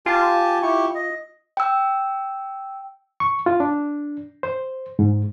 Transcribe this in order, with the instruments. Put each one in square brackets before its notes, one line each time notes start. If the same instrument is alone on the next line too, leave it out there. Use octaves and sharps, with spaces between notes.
[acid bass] F4 [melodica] G4 G#5 A5
[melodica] E4 G4 C#6
D#5
[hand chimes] G5 E6
[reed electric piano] C#6
F4
D4
C5
G#2